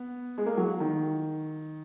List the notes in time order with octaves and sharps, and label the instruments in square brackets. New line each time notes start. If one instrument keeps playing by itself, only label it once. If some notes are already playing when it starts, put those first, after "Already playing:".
Already playing: [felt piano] B3
G#3
A#3
F#3
D#3